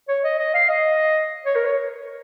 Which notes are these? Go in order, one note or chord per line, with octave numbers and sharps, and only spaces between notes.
C#5
D#5
D#5
F5
D#5
C#5
A#4
C#5